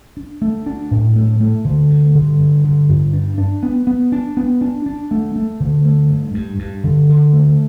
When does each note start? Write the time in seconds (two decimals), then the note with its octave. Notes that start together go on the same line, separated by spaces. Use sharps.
0.17 D4
0.42 A3
0.66 D4
0.91 A2
1.16 A3
1.40 A3
1.65 D3
1.90 G2
2.15 D3
2.39 G2
2.64 D3
2.89 G2
3.13 D4
3.38 D4
3.63 B3
3.87 B3
4.12 D4
4.37 B3
4.61 D4
4.86 D4
5.11 A3
5.36 A3
5.60 D3
5.85 A3
6.10 G2
6.34 G2
6.59 G2
6.84 D3
7.09 D3
7.33 A3